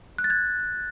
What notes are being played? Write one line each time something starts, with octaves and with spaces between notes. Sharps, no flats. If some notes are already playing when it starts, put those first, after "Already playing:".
F#6
A6
G#6